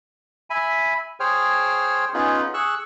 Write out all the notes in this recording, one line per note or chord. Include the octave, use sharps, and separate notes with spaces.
E5 G#5 B5
G#4 C5 C#5 G5 F6
B3 C#4 D#4 F4 G#4
G#4 C#6 E6 F#6